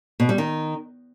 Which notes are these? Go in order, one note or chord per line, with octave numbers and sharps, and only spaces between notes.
B2
G3
D#3